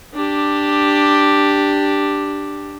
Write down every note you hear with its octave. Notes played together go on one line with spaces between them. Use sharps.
D4 G4